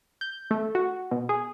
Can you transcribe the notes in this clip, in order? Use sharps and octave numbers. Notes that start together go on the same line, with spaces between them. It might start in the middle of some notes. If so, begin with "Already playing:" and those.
G6
A3
F#4
B2
G#4